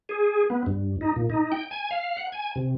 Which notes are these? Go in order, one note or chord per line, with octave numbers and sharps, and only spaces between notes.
G#4
B3
G2
D#4
A#2
D#4
G5
G#5
F5
F#5
G#5
C3